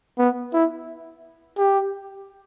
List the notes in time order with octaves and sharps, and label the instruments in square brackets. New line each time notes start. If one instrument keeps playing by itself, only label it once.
[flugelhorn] B3
E4
G4